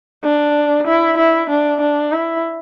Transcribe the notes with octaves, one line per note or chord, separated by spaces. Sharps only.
D4
E4
E4
D4
D4
E4